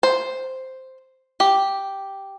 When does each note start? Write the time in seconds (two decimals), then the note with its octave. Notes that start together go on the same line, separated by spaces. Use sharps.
0.03 C5
1.40 G4